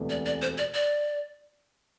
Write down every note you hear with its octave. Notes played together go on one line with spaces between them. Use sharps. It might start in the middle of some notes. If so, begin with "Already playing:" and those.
Already playing: E1 D2 C3 E3 A3
D5
D5
C5
D5
D5